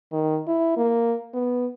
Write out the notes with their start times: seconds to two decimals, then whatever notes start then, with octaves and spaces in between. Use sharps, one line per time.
0.12 D#3
0.47 E4
0.77 A#3
1.34 B3